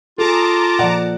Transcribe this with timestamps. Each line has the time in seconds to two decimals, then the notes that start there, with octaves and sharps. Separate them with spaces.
0.18 F4 G#4 A4 A5 A#5 D6
0.79 A#2 F3 D5 F#5